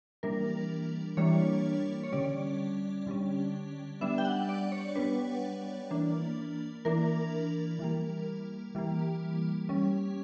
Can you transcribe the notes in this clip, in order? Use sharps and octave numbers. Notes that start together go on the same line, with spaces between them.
E3 G3 A#3 D4 A#4
E3 G3 A#3 D4 C#5
C#5
D3 G3 C#4 D5
D3 G3 C#4
G3 B3 D4 E5
G5
F#5
D5
C#5
G3 B3 D4 B4
E3 A#3 D4
E3 A#3 D4 A#4
E3 G3 A#3
E3 G3 A#3
G3 C#4